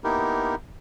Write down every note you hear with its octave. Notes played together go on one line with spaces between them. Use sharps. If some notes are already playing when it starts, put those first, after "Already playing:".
A#3 B3 D#4 E4 G4 A#4